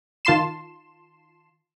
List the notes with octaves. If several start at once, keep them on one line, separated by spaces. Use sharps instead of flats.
D#3 F4 A5 C6 C7 E7